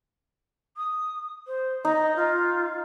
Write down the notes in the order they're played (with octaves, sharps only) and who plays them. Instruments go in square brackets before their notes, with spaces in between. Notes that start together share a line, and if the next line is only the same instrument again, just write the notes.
[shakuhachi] D#6
C5
[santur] D#4 [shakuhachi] D#5
[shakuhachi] F4